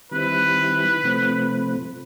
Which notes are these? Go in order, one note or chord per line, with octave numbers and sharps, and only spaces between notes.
D#3 G3 C4 E4 B4
C3 F3 A3 C4